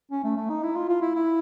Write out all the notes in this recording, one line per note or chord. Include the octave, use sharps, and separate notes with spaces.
C#4
A3
A3
D#4
E4
F4
F4
E4
E4